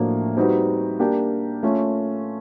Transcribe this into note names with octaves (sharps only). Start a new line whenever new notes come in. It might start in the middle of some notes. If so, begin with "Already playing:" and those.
Already playing: A2 F3 A#3 D4 F#4
G3 C4 D#4 F#4 B4
A#3 D4 G4 A#4
A3 C#4 F4